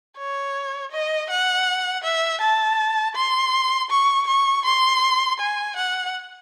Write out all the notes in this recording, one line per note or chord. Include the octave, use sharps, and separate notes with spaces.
C#5
D#5
F#5
E5
A5
C6
C#6
C#6
C6
G#5
F#5